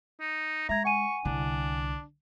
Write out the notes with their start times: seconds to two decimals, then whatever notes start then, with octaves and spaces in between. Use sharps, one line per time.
0.20 D#4
0.69 G#3 E5 A#5 G#6
0.84 F#5 G#5 C#6 D#7
1.25 C2 D3 D4